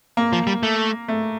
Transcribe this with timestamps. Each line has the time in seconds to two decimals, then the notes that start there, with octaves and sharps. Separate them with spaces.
0.17 A#3
0.33 F3
0.47 G3
0.63 A3
1.08 A3